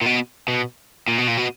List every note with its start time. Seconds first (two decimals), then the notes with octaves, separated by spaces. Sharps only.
0.01 A#2
0.06 B2
0.48 B2
1.08 A#2
1.18 B2
1.28 A#2
1.37 B2